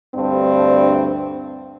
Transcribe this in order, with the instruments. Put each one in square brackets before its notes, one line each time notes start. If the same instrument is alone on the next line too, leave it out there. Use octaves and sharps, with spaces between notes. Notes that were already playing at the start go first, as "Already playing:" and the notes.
[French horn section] D2 G2 C4 D4